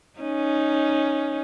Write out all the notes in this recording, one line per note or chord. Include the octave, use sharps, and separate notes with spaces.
C#4 D#4